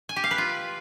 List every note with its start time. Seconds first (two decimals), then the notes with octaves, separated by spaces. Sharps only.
0.09 G#5
0.16 G4
0.24 F5
0.31 B4
0.38 F4